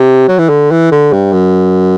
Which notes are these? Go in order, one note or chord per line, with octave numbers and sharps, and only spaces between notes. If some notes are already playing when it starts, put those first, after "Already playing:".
Already playing: C3
F#3
E3
D3
E3
D3
G2
F#2